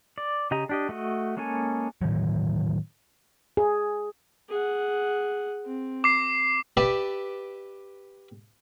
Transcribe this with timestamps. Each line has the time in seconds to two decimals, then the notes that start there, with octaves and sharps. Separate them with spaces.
0.18 D5
0.51 C#3 G4 D#5 A#5
0.69 D4 G4 D#5
0.89 A3 F#4 D#5
1.37 G#3 A#3 C#4 A4 G#5
2.02 A2 D#3 E3 F#3
3.57 G#4
4.49 G#4 F#5
5.65 C4
6.04 D6 C7
6.77 G4 B4 D5 E5